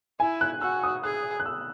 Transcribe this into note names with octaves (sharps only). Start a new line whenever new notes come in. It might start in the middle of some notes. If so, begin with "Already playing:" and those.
E4 G#5
F#6
F#4 E6
D#6
G#4 F#6
F#6
E6